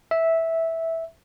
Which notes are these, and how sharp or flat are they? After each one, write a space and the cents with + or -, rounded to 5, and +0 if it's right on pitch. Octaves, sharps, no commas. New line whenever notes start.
E5 -10